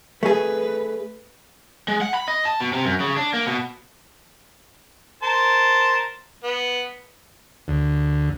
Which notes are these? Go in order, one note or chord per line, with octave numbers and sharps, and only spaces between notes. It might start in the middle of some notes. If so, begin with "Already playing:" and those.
A3 G#4 B4
G#3
F#5
B5
D#5
A5
B2
C3
F#2
C#3
D4
A#3
B2
A#4 C5 A5
B3
D2